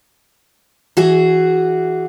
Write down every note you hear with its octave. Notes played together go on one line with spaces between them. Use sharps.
E3 F#4 G#4